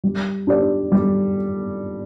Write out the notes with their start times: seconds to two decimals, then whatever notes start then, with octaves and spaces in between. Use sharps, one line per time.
0.04 G3
0.47 D4 G4 D5
0.92 G3